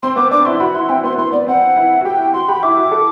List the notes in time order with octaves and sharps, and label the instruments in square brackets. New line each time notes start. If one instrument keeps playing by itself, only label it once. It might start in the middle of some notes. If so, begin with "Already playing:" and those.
[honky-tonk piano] C4 [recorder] C6
[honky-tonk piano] B3 [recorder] D6
[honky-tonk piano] D4 [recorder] D6
[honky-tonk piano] E4 [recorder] C6
[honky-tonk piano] F#4 [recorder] B5
[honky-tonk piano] E4 [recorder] C6
[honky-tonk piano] C4 [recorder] G5
[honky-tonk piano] B3 [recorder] C6
[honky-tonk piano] B3 [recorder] C6
[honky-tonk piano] B3 [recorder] D5
[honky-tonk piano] C4 [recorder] F#5
[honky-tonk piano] E4
F#4
[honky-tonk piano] G4 [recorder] G5
[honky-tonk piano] F#4 [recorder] C6
[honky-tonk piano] G4 [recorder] B5
[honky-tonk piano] E4 [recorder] D6
[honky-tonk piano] F#4
A4